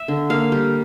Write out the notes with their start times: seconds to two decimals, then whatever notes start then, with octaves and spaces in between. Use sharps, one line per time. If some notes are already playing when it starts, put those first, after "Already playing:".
Already playing: E5
0.08 D3
0.30 A#3 F5
0.52 G3